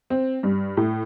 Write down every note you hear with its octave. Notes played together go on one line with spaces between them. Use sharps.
C4
G2
A2